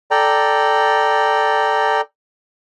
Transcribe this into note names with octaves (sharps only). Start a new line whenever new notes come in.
A4 D5 G5 A#5